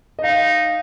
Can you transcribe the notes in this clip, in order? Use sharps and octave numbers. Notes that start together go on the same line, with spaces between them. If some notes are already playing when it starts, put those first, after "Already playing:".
D#5
D#4 F5